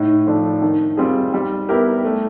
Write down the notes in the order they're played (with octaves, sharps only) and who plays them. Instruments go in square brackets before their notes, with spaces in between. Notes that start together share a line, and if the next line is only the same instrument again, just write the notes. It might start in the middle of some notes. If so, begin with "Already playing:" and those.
Already playing: [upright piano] A2 [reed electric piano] D#4
[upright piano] F3 A3 D4
D#3
G3 C4 F4 G#4
G3
B3 E4 G4 A#4
A3